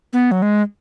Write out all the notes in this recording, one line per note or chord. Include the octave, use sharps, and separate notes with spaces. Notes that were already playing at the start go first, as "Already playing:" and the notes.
B3
F#3
G#3